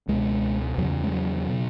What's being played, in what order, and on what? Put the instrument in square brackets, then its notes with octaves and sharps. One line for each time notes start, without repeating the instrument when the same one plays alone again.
[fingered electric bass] C#2 B2 G#3
E2 F#3
C#3
G#3
F#3
B2